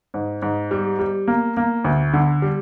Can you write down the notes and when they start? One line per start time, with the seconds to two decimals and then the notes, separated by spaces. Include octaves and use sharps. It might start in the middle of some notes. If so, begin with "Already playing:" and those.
0.14 G#2
0.42 G#2
0.71 G3
0.99 G3
1.28 A#3
1.57 A#3
1.84 D2
2.13 D3
2.42 G3